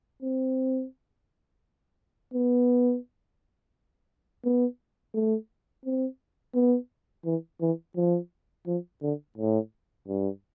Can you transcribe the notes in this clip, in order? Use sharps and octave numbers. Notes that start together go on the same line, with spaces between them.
C4
B3
B3
A3
C4
B3
E3
E3
F3
F3
D3
A2
G2